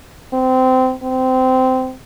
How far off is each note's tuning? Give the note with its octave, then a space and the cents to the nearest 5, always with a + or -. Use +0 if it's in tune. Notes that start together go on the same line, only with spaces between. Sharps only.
C4 -20
C4 -20